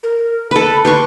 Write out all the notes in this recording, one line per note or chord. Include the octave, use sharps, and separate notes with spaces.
A#4
A4 B4 B5
G4 B4 C6 C#6